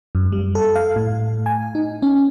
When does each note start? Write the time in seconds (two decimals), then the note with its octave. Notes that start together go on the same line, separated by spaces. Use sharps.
0.15 F#2
0.32 G3
0.55 A4
0.75 F5
0.96 A2
1.46 G#5
1.75 D#4
2.02 C#4